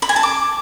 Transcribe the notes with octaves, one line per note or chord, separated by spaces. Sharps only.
B5
G#5
A5
D6